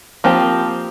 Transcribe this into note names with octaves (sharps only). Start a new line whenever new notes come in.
F3 A#3 C4 G4